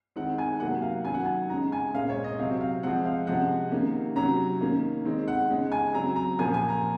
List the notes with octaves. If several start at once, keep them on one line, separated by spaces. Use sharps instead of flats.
D#3 G#3 C4 F#5
G#5
C3 F#3 A#3 F#5
F5
D#3 F#3 C#4 G#5
F#5
G#5
C#3 G#3 C#4 A#5
G#5
A#2 G#3 C#4 F5
C#5
D#5
C3 F#3 C4 F5
F5
F3 G#3 C4 F#5
F5
C3 F3 G#3 C#4 F#5
C3 D#3 A#3 C#4
C3 F#3 C#4 A#5
D#3 A#3 C#4
D#3 G#3 C4
F#5
C#3 G#3 C#4
G#5
C#3 F#3 C4 A#5
A#5
A#2 F3 A#3 C#4 G#5
G#5
A#5